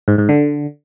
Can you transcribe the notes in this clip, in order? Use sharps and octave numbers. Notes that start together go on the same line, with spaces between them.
G#2
G#2
D3